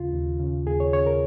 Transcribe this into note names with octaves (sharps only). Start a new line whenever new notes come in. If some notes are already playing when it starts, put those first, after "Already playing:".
Already playing: D#2 C#3 F4
D#2
C#3
D#2 G#4
C#5
C#3 C#5
A#4